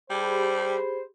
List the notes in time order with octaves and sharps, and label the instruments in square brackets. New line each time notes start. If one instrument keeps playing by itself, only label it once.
[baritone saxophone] G3 [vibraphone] G4 G#4 B5 [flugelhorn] C5